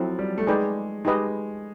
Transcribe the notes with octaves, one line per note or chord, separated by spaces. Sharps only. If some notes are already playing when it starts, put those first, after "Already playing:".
Already playing: F3 F#3 C4 E4 A4
G3
A3
G#3 D#4 G#4 B4 D5 G5
G#3 D#4 G4 B4 D#5